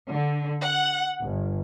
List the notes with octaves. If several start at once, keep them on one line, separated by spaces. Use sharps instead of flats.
D3
F#5
G1